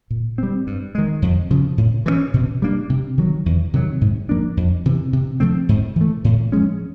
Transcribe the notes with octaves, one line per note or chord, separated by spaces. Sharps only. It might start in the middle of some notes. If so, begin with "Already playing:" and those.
A#2
G3 C4
G2
D#3 G#3
F2
C#3 F3
A2
E3 A3 C#4
B2
G3 A#3 D4
C3
D#3 F#3
E2
C3 D#3 F#3
G#2
F3 A#3 D4
F2
C3 E3
C3
F3 A3 C4
G#2
E3 A3
A2
F3 G#3 C#4